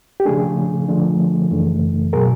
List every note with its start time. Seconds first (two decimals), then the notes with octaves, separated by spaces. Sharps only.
0.20 G4
0.26 C#3 F3 A3 D4 G#4
0.88 D3 F3 A3 D4
1.51 F#2 C#3 E3 A3
2.13 B2 F#3 G#4 A#4